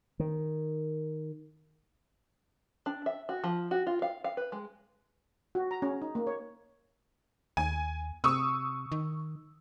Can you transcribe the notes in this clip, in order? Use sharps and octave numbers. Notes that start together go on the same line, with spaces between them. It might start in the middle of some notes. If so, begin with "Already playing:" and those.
D#3
D4
E5
F#4
F3
F#4
F4
F5
F5
B4
G#3
F#4
A#5
C#4
D#4
A#3
C#5
D#2 G#5
C3 C#6 D#6 E6
D#3